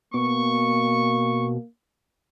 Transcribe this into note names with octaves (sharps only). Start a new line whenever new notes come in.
B2 A#3 C#6